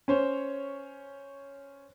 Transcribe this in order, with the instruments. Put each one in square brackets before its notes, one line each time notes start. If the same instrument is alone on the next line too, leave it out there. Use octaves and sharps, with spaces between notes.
[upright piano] C#4 C5 C#5